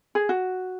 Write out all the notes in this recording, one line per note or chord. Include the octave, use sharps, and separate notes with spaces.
G#4
F#4